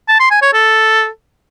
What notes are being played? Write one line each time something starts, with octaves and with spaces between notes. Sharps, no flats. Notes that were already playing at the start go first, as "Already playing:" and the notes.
A5
C6
G#5
C#5
A4